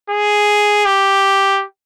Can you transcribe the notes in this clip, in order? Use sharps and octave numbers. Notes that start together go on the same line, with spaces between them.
G#4
G4